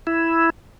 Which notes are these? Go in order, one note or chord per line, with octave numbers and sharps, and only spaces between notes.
E4